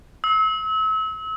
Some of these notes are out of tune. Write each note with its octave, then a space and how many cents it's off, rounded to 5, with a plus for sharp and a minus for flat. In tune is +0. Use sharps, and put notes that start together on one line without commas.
E6 -35